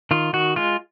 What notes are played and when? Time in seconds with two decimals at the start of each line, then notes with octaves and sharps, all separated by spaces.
0.11 D#3 F4
0.33 D#3 F#4
0.56 G#3 F4